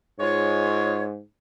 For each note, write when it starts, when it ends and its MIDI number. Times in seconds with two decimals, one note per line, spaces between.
0.20 1.19 44
0.20 1.03 56
0.20 1.03 65
0.20 1.03 73